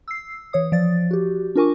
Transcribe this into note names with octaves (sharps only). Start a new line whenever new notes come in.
E6 C7
E3 C#5 D#6
F3 D5 A6
F#4 G4
D4 F4 A#4 G#5 C#6 D6